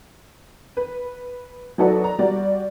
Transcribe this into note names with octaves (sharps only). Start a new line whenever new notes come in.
B4
F#3 D#4 F#4 A4 B4 D5
A#5
G3 F#4 D5